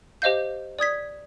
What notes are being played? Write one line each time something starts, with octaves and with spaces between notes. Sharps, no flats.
G4 C5 D#5 F5 G6
D5 D#6 G#6 B6